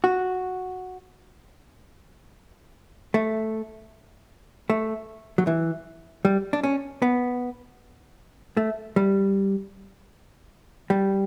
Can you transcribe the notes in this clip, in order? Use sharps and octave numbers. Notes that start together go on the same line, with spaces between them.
F#4
A3
A3
F#3
E3
G3
D4
C#4
B3
A3
G3
G3